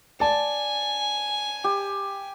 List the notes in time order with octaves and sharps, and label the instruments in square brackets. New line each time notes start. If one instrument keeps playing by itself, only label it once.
[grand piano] D5 A5 [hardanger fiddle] G#5
[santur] G4